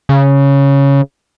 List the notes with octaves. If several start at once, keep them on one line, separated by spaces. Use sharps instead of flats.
C#3